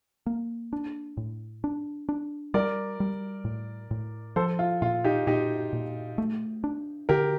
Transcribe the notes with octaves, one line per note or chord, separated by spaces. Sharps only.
A#3
D4
A2
D4
D4
G3 A#4 D5
G3
A2
A2
F3 A4 C5
F4
A#2 F4
D#4 G4
A#2 D#4 G4
A#2
A3
D4
D3 G4 A#4